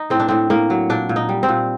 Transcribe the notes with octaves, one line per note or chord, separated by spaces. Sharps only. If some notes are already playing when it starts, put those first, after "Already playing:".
Already playing: D#4
A2 C4
D4
A2 C4
A2 A#3
F#3
A#2 D4
A#2
D#4
G3
C4
A#2